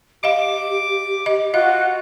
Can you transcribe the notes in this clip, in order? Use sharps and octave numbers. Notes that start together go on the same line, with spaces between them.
G4 D#5 F5 D6
D#5
F4 F#4 D#5 F#5 F#6